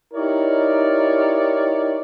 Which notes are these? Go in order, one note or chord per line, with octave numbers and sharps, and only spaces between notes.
D#4 E4 G4 A#4 C#5 D5